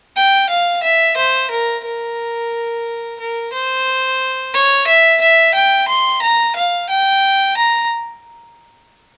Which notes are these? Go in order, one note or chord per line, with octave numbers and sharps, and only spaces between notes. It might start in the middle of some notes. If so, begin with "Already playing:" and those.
G5
F5
E5
C5
A#4
A#4
A#4
C5
C#5
E5
E5
G5
C6
A#5
F5
G5
A#5